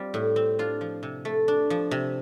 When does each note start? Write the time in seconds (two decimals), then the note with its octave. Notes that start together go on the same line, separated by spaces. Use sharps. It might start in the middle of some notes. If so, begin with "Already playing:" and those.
Already playing: G3 C4 F4
0.14 A2
0.36 C4
0.59 D4 F4
0.81 F3
1.03 C3
1.25 A3
1.48 D4
1.70 F3
1.91 C3